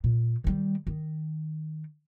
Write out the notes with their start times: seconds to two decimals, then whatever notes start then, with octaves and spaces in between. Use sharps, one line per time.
0.04 A#2
0.44 D#3 G3
0.87 D#3